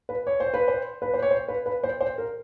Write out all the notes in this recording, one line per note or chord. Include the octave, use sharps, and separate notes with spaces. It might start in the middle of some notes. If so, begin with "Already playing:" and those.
B4
C#5
C5
B4
C5
B4
C5
C#5
C5
B4
B4
C5
C5
A#4